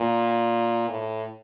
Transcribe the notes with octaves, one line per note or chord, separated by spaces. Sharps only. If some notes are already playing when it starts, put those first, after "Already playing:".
Already playing: A#2
A2